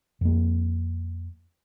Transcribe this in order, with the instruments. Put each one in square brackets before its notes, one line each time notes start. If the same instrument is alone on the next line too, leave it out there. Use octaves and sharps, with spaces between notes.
[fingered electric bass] F2 A#3